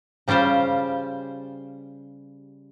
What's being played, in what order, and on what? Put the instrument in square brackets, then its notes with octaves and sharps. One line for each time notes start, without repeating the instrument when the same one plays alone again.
[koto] C#3 G3 F4 G4 C5